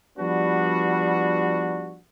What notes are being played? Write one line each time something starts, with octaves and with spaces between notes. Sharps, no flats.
F3 G3 B3 D4 F#4